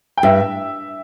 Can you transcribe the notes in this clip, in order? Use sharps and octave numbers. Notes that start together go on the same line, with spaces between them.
G5
G2 E5